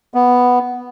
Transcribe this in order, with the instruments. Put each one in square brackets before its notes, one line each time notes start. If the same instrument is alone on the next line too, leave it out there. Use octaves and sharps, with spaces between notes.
[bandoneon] B3